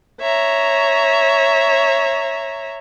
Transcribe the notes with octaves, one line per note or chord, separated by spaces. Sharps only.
C#5 E5 A#5